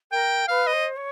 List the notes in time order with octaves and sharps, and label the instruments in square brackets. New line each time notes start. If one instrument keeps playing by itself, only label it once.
[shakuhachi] A#4 [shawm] G5
[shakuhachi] B4 [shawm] F5
[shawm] D#5
[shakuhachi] C5
C#5